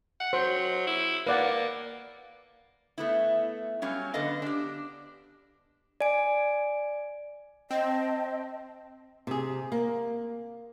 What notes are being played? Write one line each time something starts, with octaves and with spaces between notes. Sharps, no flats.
F#5
F#3 C5
E4
A#3 B4 D5 F#5
A3 B3 E4
F#3 G3 C#4 F5
D3 B3 A4 B4 D#5 F5
D4 G4
D5 G#5 D7
C4 D#5 G5 A5
C3 G#4
A#3